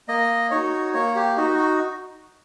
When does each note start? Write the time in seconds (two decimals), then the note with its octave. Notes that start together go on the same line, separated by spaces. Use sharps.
0.08 A#3 D#5
0.51 D#4 F#4 C#5
0.94 A#3 C#5
1.15 G4
1.37 D#4 F#4
1.59 F#4